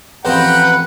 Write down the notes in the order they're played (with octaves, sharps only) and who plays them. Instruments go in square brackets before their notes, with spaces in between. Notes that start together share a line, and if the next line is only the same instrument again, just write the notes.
[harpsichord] A1 F2 C5 [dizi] B4 [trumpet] F#5 [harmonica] G5 A#5